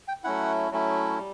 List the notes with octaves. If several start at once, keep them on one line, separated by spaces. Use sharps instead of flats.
G5
F#3 A3 C#4 E4 F#5
F#3 A3 C#4 E4
G3